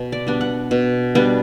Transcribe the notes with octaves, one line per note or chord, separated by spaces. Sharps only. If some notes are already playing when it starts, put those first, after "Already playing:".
Already playing: B2
D5
G3 B3 D4
F#5
B2
G3 B3 D4